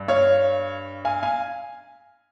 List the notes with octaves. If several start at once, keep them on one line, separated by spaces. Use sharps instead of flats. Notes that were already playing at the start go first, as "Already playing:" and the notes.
Already playing: G2
C#5 F5
F5 G#5
F5 G#5